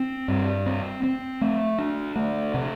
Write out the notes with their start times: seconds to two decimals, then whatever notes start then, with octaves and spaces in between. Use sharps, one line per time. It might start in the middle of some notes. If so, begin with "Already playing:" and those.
Already playing: C4
0.28 G2
0.66 C4
1.03 C4
1.41 A3
1.79 D4
2.16 A3
2.54 C3